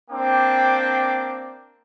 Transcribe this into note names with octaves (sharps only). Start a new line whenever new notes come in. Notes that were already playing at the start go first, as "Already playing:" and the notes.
A#3 C4 D4 G5 D6